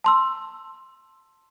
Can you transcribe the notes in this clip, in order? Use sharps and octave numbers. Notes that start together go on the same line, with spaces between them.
A5 C6 E6